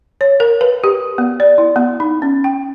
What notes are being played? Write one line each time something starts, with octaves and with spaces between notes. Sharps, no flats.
C#5
A#4
B4
G4
B3
D5
E4
B3
D#4
C#4
G5